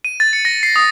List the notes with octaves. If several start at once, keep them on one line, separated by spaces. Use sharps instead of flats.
D#7
A6
C#7
A#6
C7
D#6